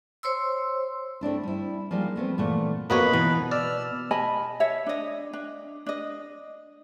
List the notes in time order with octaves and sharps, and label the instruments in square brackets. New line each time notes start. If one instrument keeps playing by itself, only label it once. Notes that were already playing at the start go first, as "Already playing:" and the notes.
[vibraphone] C5 C#5 C6 E6
[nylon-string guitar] A3 C4 D4 E4
G3 E4
F3 G3 G#3 A#3 D#4
A3 B3 C4
A#2 E3 A3 F#5
[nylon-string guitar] F2 F#4 D#5 [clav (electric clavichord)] A#3 B3 C#5 [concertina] B4 B5
[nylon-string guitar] B2 [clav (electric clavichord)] E3
[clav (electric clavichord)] D5 [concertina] E6 F6
[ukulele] D#5 G#5 A5 B5
C#5 E5
D4 D#5
D4
D4 D#5